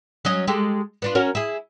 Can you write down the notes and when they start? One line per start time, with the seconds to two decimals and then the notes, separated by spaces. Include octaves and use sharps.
0.25 F#3 C#4 D#5
0.47 G#3 G4 A4
1.02 B3 D4 F4
1.15 C#4 F#4 A#4
1.35 E4 G#4